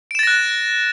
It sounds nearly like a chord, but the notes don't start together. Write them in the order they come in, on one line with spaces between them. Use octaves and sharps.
D7 E7 A6 A#6 F#6